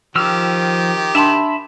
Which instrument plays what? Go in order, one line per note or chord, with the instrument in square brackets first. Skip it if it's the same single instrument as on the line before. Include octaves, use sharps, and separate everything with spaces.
[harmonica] D#3 G4 [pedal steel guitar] F3 E6 F6
[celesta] D4 A5 C6 [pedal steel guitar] E5 B5